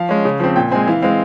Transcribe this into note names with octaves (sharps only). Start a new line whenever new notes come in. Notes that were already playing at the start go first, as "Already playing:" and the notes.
Already playing: F3 F5
G#3 C#4
C#3
F3 C4
A#2 G5
G#3 C4 G#5
E3 F5
G#3 C4 F5